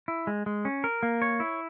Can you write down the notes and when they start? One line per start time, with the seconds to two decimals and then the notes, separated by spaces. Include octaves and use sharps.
0.08 E4
0.27 G#3
0.46 G#3
0.65 C#4
0.84 A#4
1.03 A#3
1.22 C#5
1.40 E4